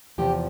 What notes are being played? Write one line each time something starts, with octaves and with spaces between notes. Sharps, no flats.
E2 C3 F3 G4